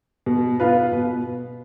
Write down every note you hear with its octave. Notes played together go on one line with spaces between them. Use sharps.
B2
B3 F4 B4
B2